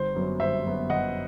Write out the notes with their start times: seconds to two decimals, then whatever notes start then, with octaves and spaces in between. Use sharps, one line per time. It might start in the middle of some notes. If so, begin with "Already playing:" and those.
Already playing: G1 C5
0.15 F#2 F#3 B3
0.40 G1 C5 E5
0.65 F#2 F#3 B3
0.90 G1 D#5 F#5